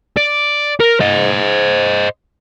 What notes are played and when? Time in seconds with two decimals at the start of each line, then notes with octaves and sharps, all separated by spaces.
0.17 D5
0.80 A#4
1.00 C5 D#5